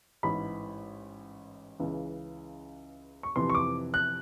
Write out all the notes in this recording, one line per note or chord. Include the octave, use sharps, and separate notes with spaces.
A1 G#2 E3 B5
C#2 C#3 E3
C#6
F1 F2 C3 E3 C6
C#6
D6
F#6